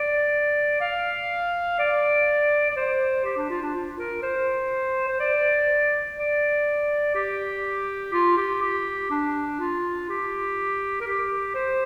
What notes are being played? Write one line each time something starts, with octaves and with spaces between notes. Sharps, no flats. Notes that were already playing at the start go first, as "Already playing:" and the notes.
Already playing: D5
F5
D5
D5
C5
G4
D4
F4
D4
F4
A#4
C5
C5
D5
D5
G4
F4
G4
G4
D4
F4
G4
A#4
G4
C5